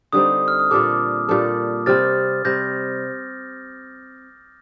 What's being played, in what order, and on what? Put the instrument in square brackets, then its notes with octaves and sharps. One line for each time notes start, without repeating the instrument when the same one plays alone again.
[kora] D3 G3 C4 D#4 [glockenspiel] D#6
[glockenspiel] F6
D#6
[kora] A#2 G3 D4 A4 [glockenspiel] D6
[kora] A#2 G3 D4 A4
[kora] C3 G3 C4 [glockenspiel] F6 A6
[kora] C3 G3 C4 [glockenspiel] G6 A#6